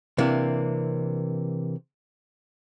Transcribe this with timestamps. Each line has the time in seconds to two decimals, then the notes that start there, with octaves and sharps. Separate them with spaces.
0.18 C3 E3 A#3 D4